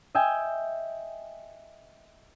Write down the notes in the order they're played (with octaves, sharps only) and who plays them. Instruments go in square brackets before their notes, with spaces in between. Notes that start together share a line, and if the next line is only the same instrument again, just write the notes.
[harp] D#5 E5 G5 G#5